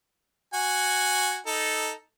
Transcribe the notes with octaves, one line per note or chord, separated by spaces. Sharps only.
F#4 G#5
D#4 A4